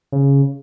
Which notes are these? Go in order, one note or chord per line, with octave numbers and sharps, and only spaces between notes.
C#3